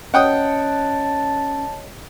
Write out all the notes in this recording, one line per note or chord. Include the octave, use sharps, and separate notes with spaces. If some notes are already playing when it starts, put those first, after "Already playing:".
C#4 C#5 D#5 F#5 G5 A5 D#6